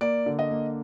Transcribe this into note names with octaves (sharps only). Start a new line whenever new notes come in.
A#3 D5
D3
D#5
A#3